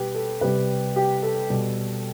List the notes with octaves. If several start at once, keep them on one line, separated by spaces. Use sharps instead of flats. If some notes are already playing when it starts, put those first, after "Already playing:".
Already playing: B2 G3 G4 B4
A4
C3 G3 G4 B4
G4
A4
B2 G3